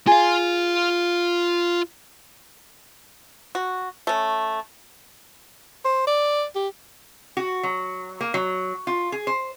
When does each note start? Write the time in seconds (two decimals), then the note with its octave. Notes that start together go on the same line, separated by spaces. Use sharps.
0.07 F4 G#4 F5
3.55 F#4
4.07 A3 C#4
5.85 C5
6.07 D5
6.55 G4
7.37 F#4
7.63 F#3
8.21 A#3
8.34 F#3
8.87 F4
9.12 G#4
9.27 C5